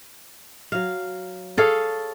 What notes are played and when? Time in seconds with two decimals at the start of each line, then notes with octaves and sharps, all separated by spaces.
0.72 F#3 F5
1.57 G#4 A4 C#5 F5